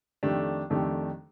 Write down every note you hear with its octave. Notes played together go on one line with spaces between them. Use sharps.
F2 D#3 A3 D4 G4
F2 D#3 A3 D4 G4